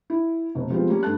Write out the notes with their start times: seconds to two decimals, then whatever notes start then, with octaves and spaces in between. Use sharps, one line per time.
0.10 E4
0.55 F1 B2
0.70 F3 G3 G#3 B3 C4 F4
0.89 G3 A#3 C#4
1.03 G2 A3 A4 A5 F#6